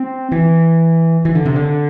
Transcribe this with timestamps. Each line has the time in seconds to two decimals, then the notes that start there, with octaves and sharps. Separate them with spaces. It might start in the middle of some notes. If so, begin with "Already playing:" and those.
Already playing: C4
0.32 E3
1.25 E3
1.35 D3
1.46 C3
1.56 D3